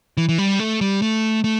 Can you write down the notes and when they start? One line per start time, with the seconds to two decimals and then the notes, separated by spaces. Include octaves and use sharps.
0.17 E3
0.29 E3
0.38 G3
0.59 A3
0.81 G3
1.02 A3
1.44 A3